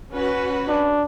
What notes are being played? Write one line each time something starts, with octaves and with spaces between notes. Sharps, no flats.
C#4 F#4 B4
D4